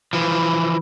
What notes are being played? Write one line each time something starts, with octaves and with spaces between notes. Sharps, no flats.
E3 F3